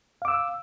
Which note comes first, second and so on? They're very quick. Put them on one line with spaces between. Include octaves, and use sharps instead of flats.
F5 D6 E6